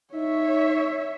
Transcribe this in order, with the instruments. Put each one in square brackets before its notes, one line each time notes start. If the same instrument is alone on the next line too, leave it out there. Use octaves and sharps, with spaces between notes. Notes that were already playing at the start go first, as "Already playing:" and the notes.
[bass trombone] D#4 [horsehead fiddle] C#5 E5